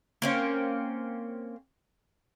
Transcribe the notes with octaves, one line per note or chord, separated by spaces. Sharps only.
A#3 C4 C#4